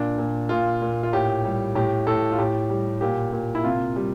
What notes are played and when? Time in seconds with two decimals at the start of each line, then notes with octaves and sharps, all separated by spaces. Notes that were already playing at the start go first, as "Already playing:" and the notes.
Already playing: A#2 D4
0.18 A#2
0.49 A#2 F4
0.82 A#2
1.03 F4
1.13 A2 G4
1.45 G3
1.75 A2 G4
2.07 A2 A4
2.32 F4
2.38 A2 G4
2.70 G3
3.01 A#2 G4
3.33 A#2
3.55 E4
3.64 C3 F4
3.96 G3